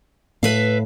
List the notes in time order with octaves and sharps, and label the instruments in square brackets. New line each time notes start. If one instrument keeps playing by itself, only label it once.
[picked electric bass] A2 [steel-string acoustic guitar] B4 E5 F5